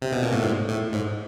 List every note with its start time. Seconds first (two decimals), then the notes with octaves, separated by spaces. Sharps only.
0.02 C3
0.12 B2
0.23 A#2
0.33 A2
0.43 G#2
0.69 A2
0.93 G#2